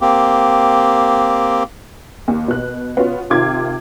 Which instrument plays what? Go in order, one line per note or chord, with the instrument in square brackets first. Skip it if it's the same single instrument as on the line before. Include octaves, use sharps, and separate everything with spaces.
[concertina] A#3 C4 G4
[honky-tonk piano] D#2
B2 F#6
B3 C#4 F4 F#4
C3 D#3 F4 D6 G#6